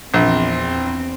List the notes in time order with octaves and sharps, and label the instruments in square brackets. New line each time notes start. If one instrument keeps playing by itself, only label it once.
[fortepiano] A#1 [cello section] E2 C4